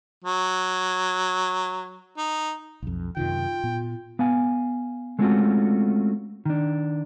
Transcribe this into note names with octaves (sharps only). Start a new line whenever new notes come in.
F#3
D#4
B1 F2
F#2 C3 D#3 F4 G5
A#2 B3
B3 F5 G#5
G#3 A3 C4 C#4 F4 F#4
D#3 D4